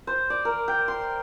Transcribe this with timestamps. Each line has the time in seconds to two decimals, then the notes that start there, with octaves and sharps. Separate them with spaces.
0.07 C5
0.30 D5
0.45 A#4
0.68 G5
0.88 C6